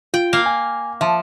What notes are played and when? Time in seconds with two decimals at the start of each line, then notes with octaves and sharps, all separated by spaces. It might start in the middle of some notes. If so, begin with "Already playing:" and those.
0.14 F4 G5
0.33 A#3 F5
0.46 G#5
1.01 F3 E5 A5